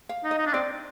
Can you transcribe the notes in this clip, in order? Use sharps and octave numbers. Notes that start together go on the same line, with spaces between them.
F5
D#4
D#5
D#4
D4
C4 D5